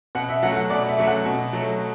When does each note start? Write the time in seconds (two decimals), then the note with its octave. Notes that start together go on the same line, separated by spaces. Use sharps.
0.15 B2 F#5
0.29 E5
0.43 F#3 A3 F#5
0.56 F#5
0.70 B2 D5
0.89 E5
0.98 F#3 A3
1.07 F#5
1.26 B2
1.53 F#3 A3